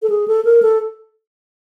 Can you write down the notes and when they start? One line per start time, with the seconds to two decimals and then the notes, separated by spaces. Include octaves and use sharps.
0.02 A4
0.10 G#4
0.28 A4
0.45 A#4
0.62 A4